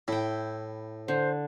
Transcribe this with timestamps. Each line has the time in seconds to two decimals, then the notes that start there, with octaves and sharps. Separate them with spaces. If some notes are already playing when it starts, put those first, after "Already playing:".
0.08 A2 E4 G5
1.08 D3 C5